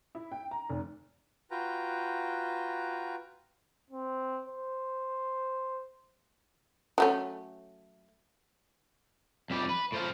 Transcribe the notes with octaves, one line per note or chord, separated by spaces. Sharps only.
E4
G5
A#5
F1
F4 F#4 B4 G5 A#5
C4
C5
F#3 A3 C#4
F2 G3 G4
B4
A2 C5 F5